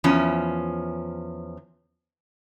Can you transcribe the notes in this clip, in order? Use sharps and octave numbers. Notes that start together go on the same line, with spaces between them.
E2 F3 C#4